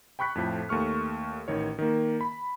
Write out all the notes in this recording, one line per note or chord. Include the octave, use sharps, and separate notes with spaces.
G5 B5 C#6 F#6 B6
F2 A2 F3
D#2 A3 C#6 F6
A1 D#3 C#5
D#3 A#3
B5